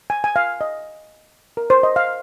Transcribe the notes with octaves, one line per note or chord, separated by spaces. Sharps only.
G#5
G#5
F5
D#5
A#4
C5
D#5
F5